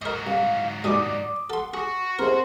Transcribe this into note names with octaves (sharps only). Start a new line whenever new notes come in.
G#2 F#3 A#4 D#5
C2 F5
D#2 B2 G#3 D5 D6 D#6
A4 F#5 C6
F#4 G#4 F#5 C#6
C4 G#4 A#4 C5 C6